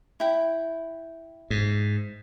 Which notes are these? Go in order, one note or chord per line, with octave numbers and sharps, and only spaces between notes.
E4 G5
G#2